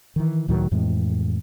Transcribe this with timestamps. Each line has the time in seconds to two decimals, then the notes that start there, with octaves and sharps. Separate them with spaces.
0.16 D#3 E3
0.48 C#2 A2 D#3 F#3
0.71 F2 A2 E3 G#3